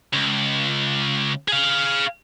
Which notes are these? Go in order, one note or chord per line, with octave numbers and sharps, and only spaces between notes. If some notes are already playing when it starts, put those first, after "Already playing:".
C#2
G#4 F5